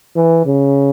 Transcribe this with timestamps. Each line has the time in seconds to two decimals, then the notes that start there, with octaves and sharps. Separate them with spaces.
0.16 E3
0.46 C#3